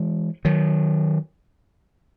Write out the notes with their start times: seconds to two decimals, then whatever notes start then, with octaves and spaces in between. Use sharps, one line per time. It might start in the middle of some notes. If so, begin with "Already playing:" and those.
Already playing: E3 G#3
0.45 D#3 F#3